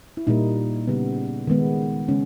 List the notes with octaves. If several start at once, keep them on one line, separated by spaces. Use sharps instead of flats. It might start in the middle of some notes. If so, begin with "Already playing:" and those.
E4
A#2 G3 A#3 D#4
C#3 G3 B3
D#3 G#3 B3
C#3 G#3 C#4